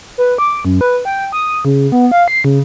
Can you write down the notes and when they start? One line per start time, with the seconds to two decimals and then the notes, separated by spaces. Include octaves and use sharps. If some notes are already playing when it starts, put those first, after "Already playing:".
0.18 B4
0.38 D6
0.65 F#2
0.81 B4
1.05 G5
1.32 D#6
1.65 C#3
1.92 B3
2.12 F5
2.28 C7
2.44 C#3